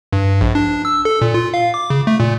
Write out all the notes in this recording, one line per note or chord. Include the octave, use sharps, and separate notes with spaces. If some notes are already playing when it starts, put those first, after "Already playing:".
G2
A#1
D4
E6
A4
A#2
F4
F5
D6
C#3
A3
A#2